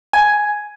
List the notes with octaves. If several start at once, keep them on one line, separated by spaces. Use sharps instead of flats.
G#5